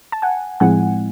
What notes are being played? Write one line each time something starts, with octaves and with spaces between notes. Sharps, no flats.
A5
F#5 G#5
A2 F3 G#3 C4 E4 F#5 G#5